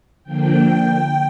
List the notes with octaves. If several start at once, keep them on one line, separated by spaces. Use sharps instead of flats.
D3 F3 A#3 D4 G5